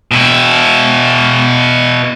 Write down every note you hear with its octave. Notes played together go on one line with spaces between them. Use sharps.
B2 E4